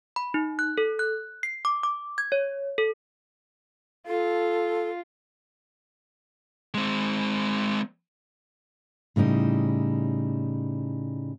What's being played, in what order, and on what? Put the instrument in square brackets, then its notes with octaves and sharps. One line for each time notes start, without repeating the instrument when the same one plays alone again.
[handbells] B5
D#4
F#6
A4
F#6
C7
D6
D6
G#6
C#5
A4
[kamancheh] F4 [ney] A4
[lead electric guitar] G#3 C4
[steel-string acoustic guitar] A2 C#3 G3 D#4 E4